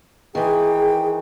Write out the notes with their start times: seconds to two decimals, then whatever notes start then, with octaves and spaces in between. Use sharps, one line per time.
0.35 D#3 E3 G#4 G5